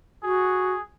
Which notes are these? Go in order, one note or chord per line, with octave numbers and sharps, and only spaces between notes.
F#4 G#4